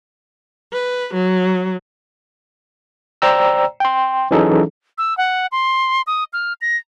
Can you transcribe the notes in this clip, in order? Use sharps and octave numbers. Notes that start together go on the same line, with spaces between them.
B4
F#3
C5 D5 G5 A#5 E6
G5 C6
E3 F#3 C#4 D#4 G#4 A4
E6
F#5
C6
D#6
F6
A#6